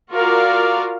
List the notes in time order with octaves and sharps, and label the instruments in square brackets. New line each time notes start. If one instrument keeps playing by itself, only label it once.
[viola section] F4 F#4 A#4 D5 F5